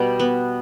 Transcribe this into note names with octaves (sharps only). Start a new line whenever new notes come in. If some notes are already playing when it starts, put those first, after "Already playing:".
Already playing: B2 G3
B3